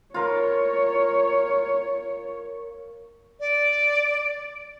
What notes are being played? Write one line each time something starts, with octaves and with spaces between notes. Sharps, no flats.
F4 A#4 C#5
D5